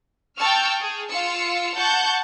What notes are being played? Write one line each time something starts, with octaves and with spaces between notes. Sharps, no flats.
G5 A5 C#6 E6 F6
G#4
F4 F5 E6 C#7
F#5 A5 C#6 G6 C#7